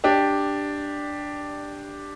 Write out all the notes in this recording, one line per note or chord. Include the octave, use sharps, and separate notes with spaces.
D4 G4